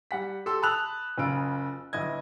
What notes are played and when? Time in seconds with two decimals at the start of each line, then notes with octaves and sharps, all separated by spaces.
0.11 G3 F#5 B6
0.46 G4 A4 C6 E6
0.62 A5 B5 D#6 E6 F#6 F7
1.18 F#1 C#3 F4 D7
1.93 G1 E4 D#5 G#6